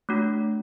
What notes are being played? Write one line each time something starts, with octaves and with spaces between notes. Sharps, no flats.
A3 D4 F#4